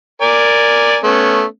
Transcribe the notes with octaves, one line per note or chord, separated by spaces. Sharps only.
A#4 D5 G#5
A3 B3 C#4